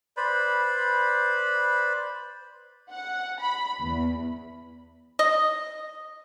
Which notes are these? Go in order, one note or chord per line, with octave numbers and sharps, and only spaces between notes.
B4 C5 D5 B5
F#5
B5
E2
D#5